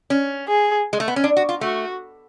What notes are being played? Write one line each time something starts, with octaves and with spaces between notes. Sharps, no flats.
C#4
G#4
G#3
A3
B3
C#4
D4
F#4
F4
A3 F#4